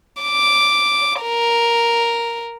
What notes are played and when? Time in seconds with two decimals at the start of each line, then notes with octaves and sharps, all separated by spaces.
0.21 D6
1.22 A#4